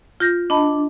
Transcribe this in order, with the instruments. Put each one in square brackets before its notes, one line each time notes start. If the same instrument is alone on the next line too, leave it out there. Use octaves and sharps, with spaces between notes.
[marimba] F4 G6 A#6
[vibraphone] D4 [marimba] D#5 A5 B5